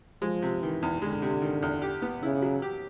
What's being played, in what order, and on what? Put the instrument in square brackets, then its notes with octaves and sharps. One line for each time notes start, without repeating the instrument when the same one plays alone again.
[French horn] F3 [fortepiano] G#3
[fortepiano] C3
[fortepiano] D#3 [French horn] E3
[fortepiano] E2
[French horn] D3 [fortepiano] G#3
[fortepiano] C3
D#3
E2
G4
B3
[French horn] C#3 [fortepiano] E4
[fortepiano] F#3
G4